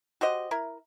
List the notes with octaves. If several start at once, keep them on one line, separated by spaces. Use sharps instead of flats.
F#4 G4 C5 D#5
E4 A#4